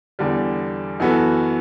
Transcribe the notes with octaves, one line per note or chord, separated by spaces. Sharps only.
E2 D3 G3
F#2 E3 B3 F#4 A4